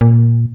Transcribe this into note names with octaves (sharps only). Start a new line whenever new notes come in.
A#2